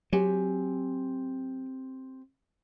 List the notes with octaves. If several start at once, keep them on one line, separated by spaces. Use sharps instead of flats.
F#3 C4 G4 G#5